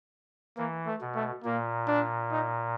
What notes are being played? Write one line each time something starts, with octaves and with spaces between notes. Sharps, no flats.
E3 A#3
A3
B2
A3
A#2 A#3
D4
D#4